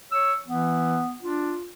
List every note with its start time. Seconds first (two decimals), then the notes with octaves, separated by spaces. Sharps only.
0.12 C#5 E6
0.47 E3 B3
1.21 D4 F4